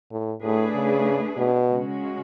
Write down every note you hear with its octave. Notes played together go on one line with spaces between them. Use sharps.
A2
A2 A3 D4 G#4 B4
C#3
B2
C#3 G#3 C#4 F#4